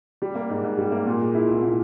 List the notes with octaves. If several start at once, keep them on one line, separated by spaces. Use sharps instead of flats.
G3
A#3
G#2
G#2
G3
A#3
A#2
G#3
E4
C2
A#2